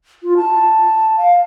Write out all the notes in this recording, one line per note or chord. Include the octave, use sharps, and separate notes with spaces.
F4
A5
F5